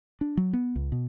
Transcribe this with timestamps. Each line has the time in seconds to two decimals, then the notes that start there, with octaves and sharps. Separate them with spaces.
0.21 D4
0.37 F#3
0.53 B3
0.76 C#2
0.92 B2